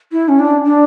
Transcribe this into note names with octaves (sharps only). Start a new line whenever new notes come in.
E4
C#4
D4
D4